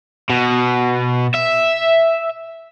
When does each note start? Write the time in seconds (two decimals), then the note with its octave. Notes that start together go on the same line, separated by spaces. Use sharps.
0.30 B2
1.34 E5